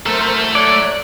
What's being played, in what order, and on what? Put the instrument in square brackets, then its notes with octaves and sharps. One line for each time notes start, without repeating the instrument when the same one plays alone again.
[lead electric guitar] F#3 E4 [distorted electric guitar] A3 A4 [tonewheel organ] A#4 C5
[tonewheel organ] C#5 F#6 [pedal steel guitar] D5